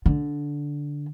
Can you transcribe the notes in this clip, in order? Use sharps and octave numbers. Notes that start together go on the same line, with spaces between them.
D3